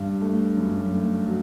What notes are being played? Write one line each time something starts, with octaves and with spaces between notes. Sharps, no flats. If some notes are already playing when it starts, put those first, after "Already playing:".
Already playing: G2
A3
F#2
A3
F#3